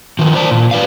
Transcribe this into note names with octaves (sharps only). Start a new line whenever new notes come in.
D#3 F3
C5 D5 A5
A#2
B4 D5 F5